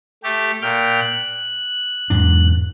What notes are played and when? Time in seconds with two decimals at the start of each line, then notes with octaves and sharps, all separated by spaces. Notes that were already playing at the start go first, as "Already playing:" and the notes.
0.24 A3 G4
0.62 A#2 G5 F6
1.00 F#6
2.10 E2 G#2 D4